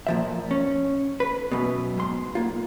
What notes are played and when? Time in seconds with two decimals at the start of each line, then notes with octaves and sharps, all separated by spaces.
0.07 A#2 F3 E5
0.51 C#4
1.20 B4
1.51 F#2 B2
1.98 G#2 C6
2.35 A#3 F4